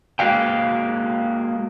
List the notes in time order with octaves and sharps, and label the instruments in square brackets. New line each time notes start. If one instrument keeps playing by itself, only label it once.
[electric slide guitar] G#3 A#3 F#4 E5 F5 G5